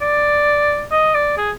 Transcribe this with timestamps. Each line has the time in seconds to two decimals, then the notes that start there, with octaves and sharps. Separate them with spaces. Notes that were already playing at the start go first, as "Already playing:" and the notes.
0.01 D5
0.92 D#5
1.14 D5
1.37 G#4